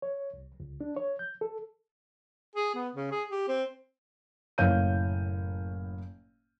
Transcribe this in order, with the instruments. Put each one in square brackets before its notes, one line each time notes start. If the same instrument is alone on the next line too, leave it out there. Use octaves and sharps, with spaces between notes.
[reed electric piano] C#5
C2
C#2
D4
C#5
G6
A4
[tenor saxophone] G#4
B3
C#3
G#4
G4
C4
[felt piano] F#1 A2 C#5 F5 G6 D#7